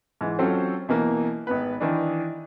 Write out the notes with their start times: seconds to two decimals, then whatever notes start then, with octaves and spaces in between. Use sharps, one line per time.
0.21 G#2 E3
0.39 F#3 C4 C#4 F4 A4 C5
0.89 B2 E3 A#3
1.47 G#1 B3 B4
1.81 D#3 E3 D4